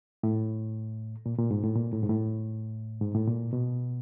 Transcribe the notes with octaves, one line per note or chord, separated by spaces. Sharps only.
A2
A#2
A#2
G#2
A2
A#2
A2
G#2
A2
G#2
A2
A#2
B2